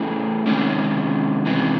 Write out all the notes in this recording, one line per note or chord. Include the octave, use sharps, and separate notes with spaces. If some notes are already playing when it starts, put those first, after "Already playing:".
Already playing: A3 C#4 E4 G#4
C3 D#3 G#3 C#4 E4
C3 E3 G#3